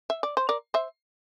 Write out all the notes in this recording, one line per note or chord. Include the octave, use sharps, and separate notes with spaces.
E5
D5
C5
A#4 D5
C5 E5